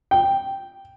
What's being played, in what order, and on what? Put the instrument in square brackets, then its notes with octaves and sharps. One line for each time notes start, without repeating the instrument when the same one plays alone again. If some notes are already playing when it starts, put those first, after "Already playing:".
[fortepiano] G5